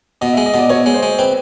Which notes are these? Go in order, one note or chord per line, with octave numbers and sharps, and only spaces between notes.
B2 D#5
G#3 E5
D#5
B2 D5
B2 C#5
G#3
C5
G#3
C4 B4